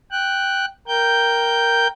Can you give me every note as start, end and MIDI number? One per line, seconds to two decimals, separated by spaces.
0.11 0.65 79
0.11 0.65 90
0.88 1.87 70
0.88 1.87 79
0.88 1.87 91